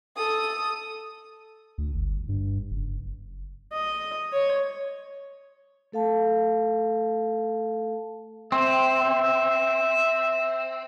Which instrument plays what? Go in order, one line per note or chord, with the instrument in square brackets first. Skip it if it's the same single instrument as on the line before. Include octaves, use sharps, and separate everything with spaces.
[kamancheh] A4 D#6
[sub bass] D2
G1
G2
F#1
[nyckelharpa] D#5
C#5
[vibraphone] A3 A4 F5 A5
[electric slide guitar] C4 [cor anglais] E5